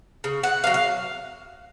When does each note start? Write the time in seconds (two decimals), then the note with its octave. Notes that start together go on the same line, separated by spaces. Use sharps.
0.24 C#3
0.43 F#5
0.64 A#3 F5
0.67 F#3
0.74 F5